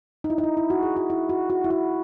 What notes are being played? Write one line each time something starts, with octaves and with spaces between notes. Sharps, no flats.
D#4
E4
D#4
E4
E4
F#4
G#4
F#4
E4
F#4
F#4
E4
F#4